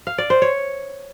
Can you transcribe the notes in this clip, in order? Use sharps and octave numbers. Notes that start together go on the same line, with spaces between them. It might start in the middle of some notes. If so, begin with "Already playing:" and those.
F5
D5
C5
C#5